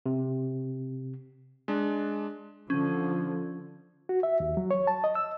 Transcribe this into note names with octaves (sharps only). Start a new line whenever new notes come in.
C3
G#3 D4
D3 F3 C#4
F#4
E5
D#2
F#3
C#5
A5
D#5
E6